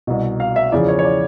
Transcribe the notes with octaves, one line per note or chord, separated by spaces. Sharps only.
C2 B2 D#5
F5
E5
E2 C#3 F3 D5
C#5
C#5
D5